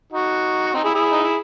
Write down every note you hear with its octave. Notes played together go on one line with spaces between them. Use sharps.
D#4 F#4
C4 D#4
E4 G#4
E4 G#4
D#4
E4